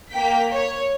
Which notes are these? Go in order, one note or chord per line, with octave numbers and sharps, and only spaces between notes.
A#3 G5 B6
C#5